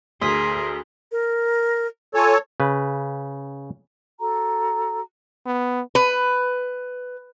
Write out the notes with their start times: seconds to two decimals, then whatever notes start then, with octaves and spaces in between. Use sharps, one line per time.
0.21 D2 G#4 A#4 C6 D#6 B6
1.10 A#4
2.14 F4 A4 C#5 G#5
2.60 C#3 B4
4.19 F#4 A4 A#5
5.46 B3
5.95 B4